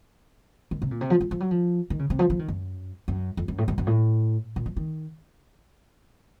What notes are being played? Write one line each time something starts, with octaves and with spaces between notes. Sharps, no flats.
D#3
C3
A#2
C3
F3
F3
F3
F#3
F3
D#3
C#3
C3
F3
F3
D#3
F#2
F#2
F2
F#2
A2
F#2
F#2
A2
A#2
F3
D#3